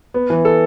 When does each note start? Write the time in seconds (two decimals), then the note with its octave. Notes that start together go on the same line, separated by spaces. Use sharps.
0.14 B3
0.30 E3
0.45 A4